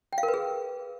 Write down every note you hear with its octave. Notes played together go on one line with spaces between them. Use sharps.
G5
F5
A#4
B4
G#4